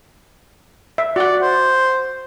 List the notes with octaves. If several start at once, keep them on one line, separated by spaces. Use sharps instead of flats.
E5
F#4 D5 F#5
C5